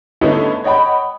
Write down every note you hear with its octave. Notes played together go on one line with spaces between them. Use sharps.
D3 A3 B3 C#4 D#4 E4
C#5 D#5 F#5 G5 B5